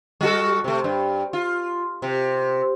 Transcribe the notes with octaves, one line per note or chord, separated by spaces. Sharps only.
G3 F#4 A4
C3 A3
G2
F4
C3